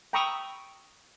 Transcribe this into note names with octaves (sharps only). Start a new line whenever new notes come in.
G5 A#5 B5 C#6 D#6 E6